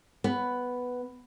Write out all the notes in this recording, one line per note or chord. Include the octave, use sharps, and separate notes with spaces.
B3